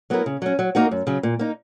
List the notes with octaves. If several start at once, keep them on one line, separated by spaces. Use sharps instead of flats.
F#3 B3 E4 A#4
C#3
F#3 C#4
F#3
A#3 D#4 F#4 A#4
F#2
C#3 F#3
A#2
A#3 D#4